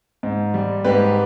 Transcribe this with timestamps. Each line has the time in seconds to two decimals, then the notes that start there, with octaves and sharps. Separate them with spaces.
0.23 G#2
0.54 G3
0.84 G#2 G4 B4